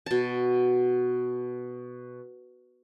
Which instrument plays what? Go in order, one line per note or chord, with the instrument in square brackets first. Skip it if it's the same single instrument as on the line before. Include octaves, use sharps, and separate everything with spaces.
[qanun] B2 A5